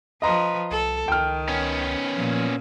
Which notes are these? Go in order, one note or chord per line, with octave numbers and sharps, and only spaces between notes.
F3 B4 D#5 A#5 C6
C2 A4
C#2 D#3 G5 F6
B3 C#4
A#2 F3